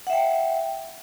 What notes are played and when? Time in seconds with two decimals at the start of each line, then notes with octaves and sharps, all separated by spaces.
0.07 F#5
0.10 E5
0.13 G5